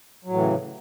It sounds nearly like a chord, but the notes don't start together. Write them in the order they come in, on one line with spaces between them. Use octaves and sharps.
F#3 A2 E3 C#3